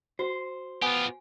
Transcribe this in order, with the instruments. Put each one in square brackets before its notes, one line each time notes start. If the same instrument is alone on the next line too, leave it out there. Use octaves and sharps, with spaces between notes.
[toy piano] F#4 [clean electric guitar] C5
[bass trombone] B3 [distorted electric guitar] F4 G4 [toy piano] G#5